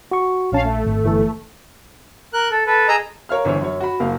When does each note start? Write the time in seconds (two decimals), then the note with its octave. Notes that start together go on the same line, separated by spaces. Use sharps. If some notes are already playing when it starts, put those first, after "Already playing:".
0.11 F#4 C#6
0.52 A#1 C#4 C#5 F5 A5
0.64 A3
0.86 G#1
1.04 G1 E3 A4
2.33 A#4 F#6
2.51 A4
2.67 A4 B4
2.88 G#4 D#5 A#5 D#6 E6
3.29 A#4 C#5 F5 F6
3.45 G1 E3 E4 C5 C#5
3.61 F#2 C#5
3.80 F#4 B5
4.00 F#1 A#3 F#4 F5